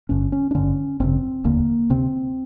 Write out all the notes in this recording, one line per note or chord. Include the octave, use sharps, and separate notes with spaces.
G1 G2 D3 C#4
C#4
D4
G#1 G2 D3 C#4
G#1 F#2 C#3 C4
F1 D#2 D3 A#3
D2 C3 C4